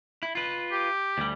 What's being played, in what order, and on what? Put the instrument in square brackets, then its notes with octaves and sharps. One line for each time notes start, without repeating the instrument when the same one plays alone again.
[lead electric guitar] E4
F4 B4
[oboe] G4
[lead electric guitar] D2 G3